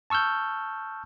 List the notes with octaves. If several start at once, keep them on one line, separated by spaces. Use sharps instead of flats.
A5 C#6 E6 F6 G6